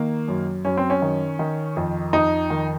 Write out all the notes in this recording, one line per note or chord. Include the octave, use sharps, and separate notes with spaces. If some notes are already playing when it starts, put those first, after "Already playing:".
Already playing: D#3 A#3
F#2
F#2 C#4
C4
C#4
D#3
D#3
F2
F2 D#4
D#3